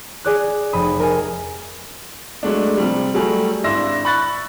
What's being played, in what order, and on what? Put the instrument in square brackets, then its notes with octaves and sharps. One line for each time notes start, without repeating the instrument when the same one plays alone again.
[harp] G#4 D5 F#6
F1 B5 D#6
A#4 D#5 G#5
[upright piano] F#3 G#3 A3 D4
C3 F3 G3
F#3 G3 A3 G#4 A4
G#1 D4 E4 C6 E6 A#6
B5 C#6 F#6 A6